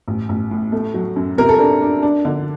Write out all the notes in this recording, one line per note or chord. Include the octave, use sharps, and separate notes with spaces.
A1
A1
A2
A3
F#3
F#2
C3 A#4
A4
D4 A#4
D4
D4
D3